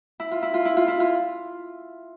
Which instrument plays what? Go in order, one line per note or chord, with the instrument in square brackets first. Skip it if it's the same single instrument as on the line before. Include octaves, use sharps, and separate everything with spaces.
[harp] E4
F4
E4
F4
E4
F4
E4
F4